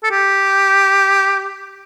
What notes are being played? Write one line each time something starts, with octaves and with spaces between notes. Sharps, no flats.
A4
G4